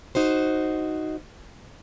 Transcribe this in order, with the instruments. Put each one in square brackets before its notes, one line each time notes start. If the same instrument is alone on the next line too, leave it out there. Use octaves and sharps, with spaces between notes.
[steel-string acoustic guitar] D#4 F#4 C5